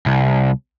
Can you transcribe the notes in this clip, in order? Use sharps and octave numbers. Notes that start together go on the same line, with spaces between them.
C2